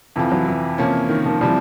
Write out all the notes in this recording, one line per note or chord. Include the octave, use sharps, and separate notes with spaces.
F2 C3 E3 F3
E3 F#3
E3
C3 F3 A#3 C#4
D#3
D#3 F3
C3 E3 F3 G3